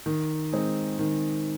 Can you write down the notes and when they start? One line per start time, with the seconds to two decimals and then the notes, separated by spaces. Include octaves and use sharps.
0.06 D#3
0.53 G#3 C4 D#4
0.99 D#3